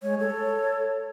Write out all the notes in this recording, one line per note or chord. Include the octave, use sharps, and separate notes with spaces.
G#3 C#5
A4 C#5